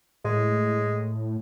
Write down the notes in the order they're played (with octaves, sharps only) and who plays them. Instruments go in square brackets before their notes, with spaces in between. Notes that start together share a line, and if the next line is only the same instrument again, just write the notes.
[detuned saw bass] A2 [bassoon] G#3